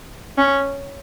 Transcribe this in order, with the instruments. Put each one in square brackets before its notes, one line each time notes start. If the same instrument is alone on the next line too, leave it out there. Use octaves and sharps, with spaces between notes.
[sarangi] C#4